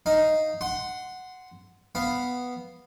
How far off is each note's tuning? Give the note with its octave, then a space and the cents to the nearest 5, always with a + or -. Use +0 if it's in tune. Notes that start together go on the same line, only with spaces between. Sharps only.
D#4 +0 F5 +0
F#5 +0 C6 -15
B3 +0 F5 +0